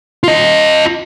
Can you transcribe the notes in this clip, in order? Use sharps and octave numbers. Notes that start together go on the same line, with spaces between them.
F4 D#5